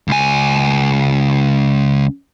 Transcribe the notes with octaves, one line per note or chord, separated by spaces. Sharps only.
C#2 G#5